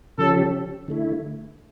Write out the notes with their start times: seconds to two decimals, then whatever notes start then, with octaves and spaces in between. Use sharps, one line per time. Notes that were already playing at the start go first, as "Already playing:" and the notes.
0.18 C#3 F3 C#4 G4 A4
0.88 D3 A3 E4